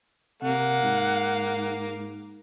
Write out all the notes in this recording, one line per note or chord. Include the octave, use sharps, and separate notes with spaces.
C3 A#3 F#5
G#2